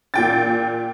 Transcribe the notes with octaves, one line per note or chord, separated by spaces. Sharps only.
A#2 G5 A6